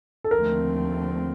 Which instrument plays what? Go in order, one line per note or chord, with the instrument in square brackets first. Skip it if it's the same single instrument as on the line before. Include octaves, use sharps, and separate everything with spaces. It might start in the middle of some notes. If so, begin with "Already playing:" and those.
[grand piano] A4
[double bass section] D#2 D3 F3 A3 C4 [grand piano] A#4